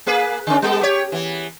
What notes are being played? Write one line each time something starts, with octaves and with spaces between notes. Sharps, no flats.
A#3 G#4 B4
D3 C#4
G3 B3 A4
G4 C#5
E3 B3